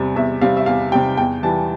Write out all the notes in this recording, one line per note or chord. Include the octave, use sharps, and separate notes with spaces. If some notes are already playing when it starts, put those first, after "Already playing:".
Already playing: E2 C3 G3
E2 E5
C3 G3 F5
E5
E2 F5
C3 G3 G5
E2 G5
E3 G3 A5